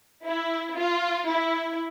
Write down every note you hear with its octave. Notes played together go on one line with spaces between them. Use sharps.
E4
F4
E4